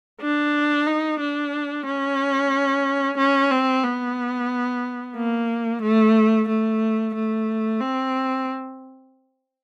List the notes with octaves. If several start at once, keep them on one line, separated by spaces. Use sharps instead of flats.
D4
D#4
D4
C#4
C#4
C4
B3
A#3
A3
A3
A3
C4